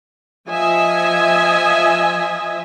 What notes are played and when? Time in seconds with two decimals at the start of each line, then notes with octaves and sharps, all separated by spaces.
0.49 F3 D#5 E5 G#5